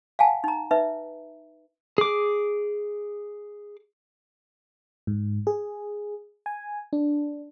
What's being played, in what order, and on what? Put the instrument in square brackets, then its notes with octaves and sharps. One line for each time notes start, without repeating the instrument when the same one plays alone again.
[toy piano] F5 F#5 G#5 A5
D#4 A#5
D#4 B4 E5
[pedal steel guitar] G#4 D6
[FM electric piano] G#2
G#4
G#5
D4